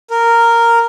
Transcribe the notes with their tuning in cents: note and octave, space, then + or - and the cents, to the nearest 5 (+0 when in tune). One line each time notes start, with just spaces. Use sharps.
A#4 -5